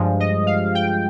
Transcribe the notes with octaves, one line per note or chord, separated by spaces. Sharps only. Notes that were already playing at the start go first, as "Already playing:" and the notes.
Already playing: G2 F3 G#3
D#5
F5
G5